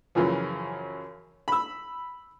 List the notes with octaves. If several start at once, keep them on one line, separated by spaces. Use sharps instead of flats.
F#2 C#3 E3 F3
B5 E6